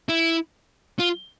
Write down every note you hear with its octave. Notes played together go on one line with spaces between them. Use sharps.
E4
F4